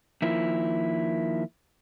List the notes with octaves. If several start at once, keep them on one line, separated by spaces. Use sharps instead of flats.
D#3 F3 A#3 E4